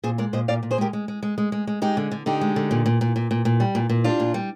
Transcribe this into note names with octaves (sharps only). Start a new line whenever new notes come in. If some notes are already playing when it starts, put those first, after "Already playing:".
A#2 G#4 C5
G#3 A#4 D5
A#2 C5 D#5
A#2 D5 F5
A#2
G#4 C5
G#3 G4 A#4
G#3
G#3
G#3
G#3
G#3
G#3
G#3 D#4 G4
D3
D3
D3 D#4 G4
G#3
D3
A#2
A#2
A#2
A#2
A#2
A#2
G3
A#2
A#2
G3 D4 F4
A#2
G3